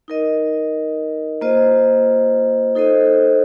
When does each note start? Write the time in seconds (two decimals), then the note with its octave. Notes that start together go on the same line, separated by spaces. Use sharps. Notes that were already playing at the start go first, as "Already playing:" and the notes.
0.08 D#4 A#4 D#5
1.41 A#3 F4 C5 D#5
2.75 D#4 A4 C5 D#5